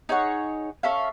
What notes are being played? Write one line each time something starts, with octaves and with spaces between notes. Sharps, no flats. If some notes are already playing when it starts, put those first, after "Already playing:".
D#4 G#4 C#5 F#5
C#4 A4 E5 F5